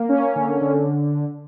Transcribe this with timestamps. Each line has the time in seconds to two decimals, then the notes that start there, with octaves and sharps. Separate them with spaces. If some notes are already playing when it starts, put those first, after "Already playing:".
Already playing: A#3
0.09 C#4
0.36 D3
0.61 D3